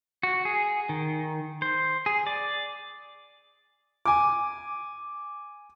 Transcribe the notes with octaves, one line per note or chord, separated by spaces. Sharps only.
F#4
G#4
D#3
C5
G#4
D5
G#5 D6